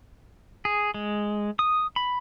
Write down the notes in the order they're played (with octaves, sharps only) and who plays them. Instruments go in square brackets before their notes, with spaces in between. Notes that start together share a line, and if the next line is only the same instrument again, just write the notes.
[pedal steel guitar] G#4
G#3
D#6
B5